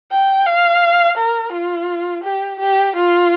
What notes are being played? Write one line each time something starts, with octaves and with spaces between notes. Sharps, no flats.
G5
F5
A#4
F4
G4
G4
F4